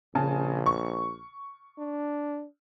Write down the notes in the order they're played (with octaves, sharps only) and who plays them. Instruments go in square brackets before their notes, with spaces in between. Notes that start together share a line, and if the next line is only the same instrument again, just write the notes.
[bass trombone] A#1 [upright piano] C#3 G#5 A5
[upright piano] C#6
[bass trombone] D4